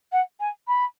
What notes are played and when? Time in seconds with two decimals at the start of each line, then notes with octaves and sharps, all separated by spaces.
0.12 F#5
0.39 G#5
0.67 B5